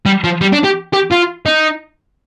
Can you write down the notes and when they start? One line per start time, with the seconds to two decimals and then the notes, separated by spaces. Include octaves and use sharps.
0.06 G3
0.24 F3
0.41 G3
0.53 D4
0.64 G4
0.94 G4
1.12 F4
1.46 D#4